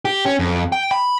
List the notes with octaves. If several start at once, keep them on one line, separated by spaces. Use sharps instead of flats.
G4
C#4
F2
G5
B5